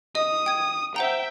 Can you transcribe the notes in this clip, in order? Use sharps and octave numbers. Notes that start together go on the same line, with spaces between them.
D#5 D#6
G5 G#6
C5 E5 F#5 G5 A#5